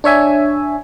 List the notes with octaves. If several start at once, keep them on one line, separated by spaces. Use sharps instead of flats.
D4 C#5 E5 G#5